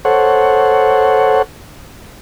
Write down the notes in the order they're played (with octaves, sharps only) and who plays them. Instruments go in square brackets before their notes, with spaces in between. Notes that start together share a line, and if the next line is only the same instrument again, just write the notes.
[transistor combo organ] A4 C5 C#5 F#5